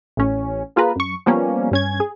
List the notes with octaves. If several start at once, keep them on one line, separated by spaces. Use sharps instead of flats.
A1 C#4
A#3 F4 G#4 B4 A#5
F#2 C#6
F3 G3 A#3 B3 C#4
G2 C#4 G#6
G#4